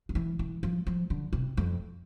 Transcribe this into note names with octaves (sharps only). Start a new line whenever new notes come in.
F3
E3
E3
F3
F3
D3
C3
F2